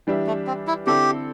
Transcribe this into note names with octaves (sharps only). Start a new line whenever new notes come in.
E3 G3 D4 G4 E5
A3
C4
E4
D3 C4 E4 G4 A4 D5